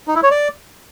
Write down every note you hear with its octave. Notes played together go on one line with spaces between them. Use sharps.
D#4
E4
C#5
D5